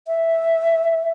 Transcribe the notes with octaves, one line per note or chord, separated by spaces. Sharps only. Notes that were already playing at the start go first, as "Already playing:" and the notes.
E5